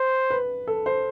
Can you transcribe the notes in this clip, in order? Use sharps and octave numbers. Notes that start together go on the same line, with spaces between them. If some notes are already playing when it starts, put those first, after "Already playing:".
Already playing: C5
B4
A4
C5